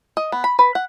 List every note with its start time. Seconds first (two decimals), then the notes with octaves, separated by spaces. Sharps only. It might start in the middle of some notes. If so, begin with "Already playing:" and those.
0.17 D#5
0.32 B3
0.44 B5
0.59 B4
0.75 F#5